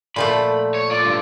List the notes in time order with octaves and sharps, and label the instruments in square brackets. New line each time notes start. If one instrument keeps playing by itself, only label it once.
[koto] A#2 F3 A3 [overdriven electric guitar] B5
[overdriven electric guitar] C#5
F4 D5
G2 D3